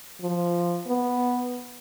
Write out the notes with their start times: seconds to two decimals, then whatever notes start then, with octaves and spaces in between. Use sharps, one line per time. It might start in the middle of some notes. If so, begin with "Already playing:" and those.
0.21 F3
0.87 B3